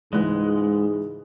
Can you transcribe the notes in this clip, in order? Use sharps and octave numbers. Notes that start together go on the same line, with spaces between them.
C#2 G#2 E3 G#3 F#6